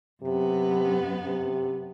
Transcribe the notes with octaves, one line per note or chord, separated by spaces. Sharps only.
F#2 C3 B3
C3